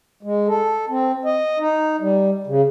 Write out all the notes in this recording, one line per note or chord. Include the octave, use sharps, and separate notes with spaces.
G#3
A4
C4
D#5
D#4
G3
C#3